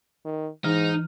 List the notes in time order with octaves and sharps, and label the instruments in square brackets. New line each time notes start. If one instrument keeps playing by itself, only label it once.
[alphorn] D#3
[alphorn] G#2 [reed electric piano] E3 F6 [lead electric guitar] D#4